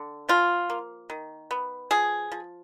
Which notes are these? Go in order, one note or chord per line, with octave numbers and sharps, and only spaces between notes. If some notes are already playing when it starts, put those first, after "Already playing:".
Already playing: D3
F3 F4
A#3
D#3
B3
F3 G#4
F3